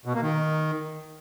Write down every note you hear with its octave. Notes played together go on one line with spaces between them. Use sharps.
B2
A#3
D#3